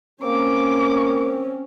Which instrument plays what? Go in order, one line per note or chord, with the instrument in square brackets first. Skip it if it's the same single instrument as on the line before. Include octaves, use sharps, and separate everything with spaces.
[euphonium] A#3 [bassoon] C4 [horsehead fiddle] C#4 [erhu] D6